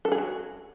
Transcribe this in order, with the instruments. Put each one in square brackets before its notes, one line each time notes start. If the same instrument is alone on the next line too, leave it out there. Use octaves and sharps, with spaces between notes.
[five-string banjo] A4
G#4
F#4